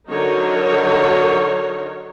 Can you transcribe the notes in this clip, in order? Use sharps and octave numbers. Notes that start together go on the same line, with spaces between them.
D3 F#3 D#4 F#4 A#4 C#5